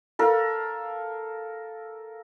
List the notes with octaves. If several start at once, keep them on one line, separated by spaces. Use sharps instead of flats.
A4 A#4 F5